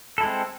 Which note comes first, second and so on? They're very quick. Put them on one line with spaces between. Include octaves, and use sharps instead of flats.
A4 E4 G#3 C4